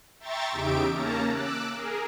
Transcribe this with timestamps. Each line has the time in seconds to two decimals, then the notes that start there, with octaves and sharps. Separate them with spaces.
0.20 E5 G5 A#5 C6 C#6 A6
0.52 E2 C#3 D#4 G4 E5 D7
0.93 A#3 C#4 A5 A#5
1.27 D6 E6 F#6
1.70 G#4 A#4